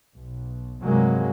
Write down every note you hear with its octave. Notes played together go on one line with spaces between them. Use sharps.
B1
G2 C3 F#3 G#3 A#3